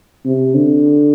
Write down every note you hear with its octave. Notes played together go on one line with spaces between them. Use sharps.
C3
D3